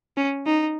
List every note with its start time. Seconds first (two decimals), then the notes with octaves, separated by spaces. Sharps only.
0.17 C#4
0.47 D#4